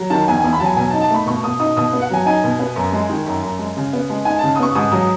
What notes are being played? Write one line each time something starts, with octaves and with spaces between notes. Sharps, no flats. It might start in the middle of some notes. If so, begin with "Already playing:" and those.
Already playing: F#3
D#3 A5
E2 G#5
E2 G#5
B5
F#3 A5
G#5
B2 G#5
A5
D#4
A5
A3 B5
B2 C#6
B2 D#6
D#4 D#6
B2 D#6
B3
F#5
F#3 G#5
D#4 G#5
B2
B3
F#2
G#3
D#3
F#2
F#2
G#3
C#3
B3
G#3
D#4 G#5
A5
C#3
D#6
B3 C#6
G#2 D#6
F#3 D#6